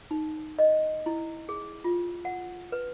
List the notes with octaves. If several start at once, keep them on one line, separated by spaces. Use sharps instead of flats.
D#4
D#5
E4
G#4
F4
F#5
B4